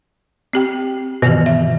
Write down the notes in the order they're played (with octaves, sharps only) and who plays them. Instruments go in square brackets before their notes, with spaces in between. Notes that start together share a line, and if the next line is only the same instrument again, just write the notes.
[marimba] C4 G4 G5
[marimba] G2 D#3 E3 [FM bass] B2
[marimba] E5